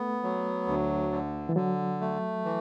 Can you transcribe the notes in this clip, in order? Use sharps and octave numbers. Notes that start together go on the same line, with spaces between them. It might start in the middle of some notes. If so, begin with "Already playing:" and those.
Already playing: A3 B3
F#3
D2
D3
E3
D3 F#3
A3
E3